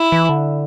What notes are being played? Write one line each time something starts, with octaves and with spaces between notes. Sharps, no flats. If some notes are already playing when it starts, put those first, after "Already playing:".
Already playing: E4
E3
D3